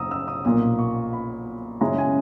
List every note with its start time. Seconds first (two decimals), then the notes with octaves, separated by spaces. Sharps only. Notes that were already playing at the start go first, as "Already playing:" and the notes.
Already playing: F#1 A#5 D#6 E6
0.11 E6
0.28 D#6
0.45 B1 A#2 A#3 D#6
0.79 C#6
1.13 B5
1.81 F#2 C#3 G#3 C#4 E4 A#5
1.98 G#5